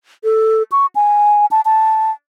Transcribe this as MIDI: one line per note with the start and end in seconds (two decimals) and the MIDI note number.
0.24 0.63 69
0.72 0.86 85
0.95 1.46 80
1.51 1.61 81
1.65 2.11 81